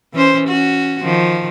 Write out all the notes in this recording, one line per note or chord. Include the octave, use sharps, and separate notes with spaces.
E3 C#4 C5
C#4 F#4
D#3 F3